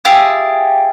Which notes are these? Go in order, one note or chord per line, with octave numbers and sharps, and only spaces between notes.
E4 F4 G4 G#4